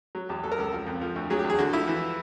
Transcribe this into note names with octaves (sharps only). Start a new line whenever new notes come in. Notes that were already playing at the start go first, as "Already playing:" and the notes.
F#3
E2 G4
F#3 A4
A#4
C#2 A4
F3
F2
F3
D2
F#3 G#4
G4
E2
G#4
D3 F#4
F3 E4
E3